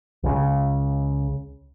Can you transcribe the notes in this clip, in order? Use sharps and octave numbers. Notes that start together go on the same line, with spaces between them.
C#2 C#3